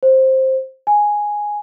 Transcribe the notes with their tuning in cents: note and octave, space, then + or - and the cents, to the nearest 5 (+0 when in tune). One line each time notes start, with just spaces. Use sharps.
C5 +10
G#5 +0